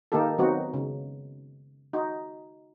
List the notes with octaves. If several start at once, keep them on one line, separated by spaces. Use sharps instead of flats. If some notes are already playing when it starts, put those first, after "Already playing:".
D#3 A#3 D#4 G4 A4
D#3 F#3 B3 C4 D#4 F#4
C#3
D#4 F#4